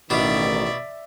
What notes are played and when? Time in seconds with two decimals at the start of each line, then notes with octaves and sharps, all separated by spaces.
0.10 A1 B2 D#3 D4 D5 E5